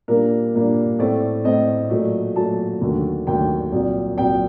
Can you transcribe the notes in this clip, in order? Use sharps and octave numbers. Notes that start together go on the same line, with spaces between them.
A#2 G3 A#3 D4 A#4
A#2 G3 A#3 D4
A2 A3 C4 D5
A2 A3 C4 D#5
A#2 F#3 A3
A#2 F#3 A3 A5
D#2 D3 F#3 A3
D#2 D3 F#3 A3 G5
C2 A#2 F#3
C2 A#2 F#3 G5